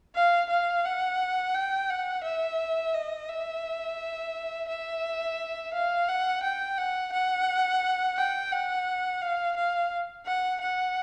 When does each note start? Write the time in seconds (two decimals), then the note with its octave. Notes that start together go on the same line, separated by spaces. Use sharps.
0.15 F5
0.50 F5
0.85 F#5
1.55 G5
1.90 F#5
2.24 E5
2.94 D#5
3.29 E5
4.69 E5
5.74 F5
6.08 F#5
6.43 G5
6.78 F#5
7.13 F#5
8.17 G5
8.52 F#5
9.22 F5
9.57 F5
10.26 F#5
10.61 F#5